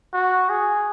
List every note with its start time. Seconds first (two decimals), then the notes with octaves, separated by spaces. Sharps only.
0.13 F#4
0.49 G#4